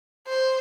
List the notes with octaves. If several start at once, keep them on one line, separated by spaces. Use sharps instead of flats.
C5